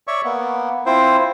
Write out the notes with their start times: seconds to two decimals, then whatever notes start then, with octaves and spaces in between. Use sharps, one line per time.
0.07 C#5 D5 E5 C#6
0.24 A#3 B3
0.86 C4 E4 F4 C5